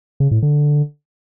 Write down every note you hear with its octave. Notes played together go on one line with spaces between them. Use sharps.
C#3
A2
D3